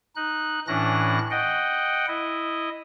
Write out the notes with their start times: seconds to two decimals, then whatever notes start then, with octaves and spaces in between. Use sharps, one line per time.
0.16 D#4 F#6
0.67 A2 E3 C#4 D4 F#6 A#6
1.31 D#5 F#5 G5
2.08 E4 D#5